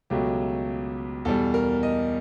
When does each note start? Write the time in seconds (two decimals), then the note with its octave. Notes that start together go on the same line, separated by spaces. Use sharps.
0.10 C#2 B2 F#3 A3 G4
1.25 E2 B2 G3 A4
1.54 A#4
1.83 D#5